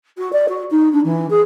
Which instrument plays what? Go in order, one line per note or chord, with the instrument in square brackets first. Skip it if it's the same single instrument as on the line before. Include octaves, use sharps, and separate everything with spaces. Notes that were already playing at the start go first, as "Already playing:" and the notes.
[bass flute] F#4
D5
F#4
D#4
D4
E3
G#4